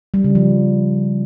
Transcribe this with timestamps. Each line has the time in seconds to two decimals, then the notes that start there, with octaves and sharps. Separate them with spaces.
0.14 G3
0.24 C#3
0.35 F3